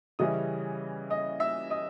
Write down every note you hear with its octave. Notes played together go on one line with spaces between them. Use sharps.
C#3 E3 G3 C#4 E4 D#5 D#6
D#5 D#6
E5 E6
D#5 D#6